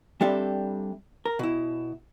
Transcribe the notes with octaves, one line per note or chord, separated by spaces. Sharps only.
G3 C4 D4 G4 A4 E5
A#4
B2 E4